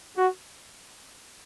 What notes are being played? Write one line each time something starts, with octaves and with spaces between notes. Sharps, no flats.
F#4